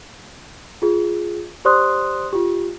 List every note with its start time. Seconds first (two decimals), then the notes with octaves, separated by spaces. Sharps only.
0.82 F4 G#4
1.65 G4 C5 D5 C6 D#6 F#6
2.33 F4 G4